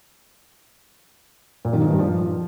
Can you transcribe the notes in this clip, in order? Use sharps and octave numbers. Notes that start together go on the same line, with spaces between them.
A#2
D#3
G#2
G2
F3